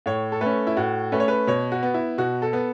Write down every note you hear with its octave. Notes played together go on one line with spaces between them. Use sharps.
A2 C#5
A4
A3 C#4 B4
E4
A2 F#4
A3 C#4 B4
C#5
B4
B2 C#5
F#4
B3
E4
B2 F#4
A4
B3